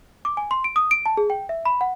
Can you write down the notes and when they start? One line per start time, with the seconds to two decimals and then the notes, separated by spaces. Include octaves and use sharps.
0.25 D6
0.37 G#5
0.51 C6
0.64 D7
0.76 D#6
0.91 D7
1.06 A5
1.17 G#4
1.30 G5
1.49 E5
1.66 B5
1.81 F#5